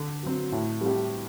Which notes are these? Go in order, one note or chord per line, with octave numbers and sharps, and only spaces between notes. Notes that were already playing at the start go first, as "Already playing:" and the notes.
Already playing: D3
F#3 C4
A2
G3 C4 G4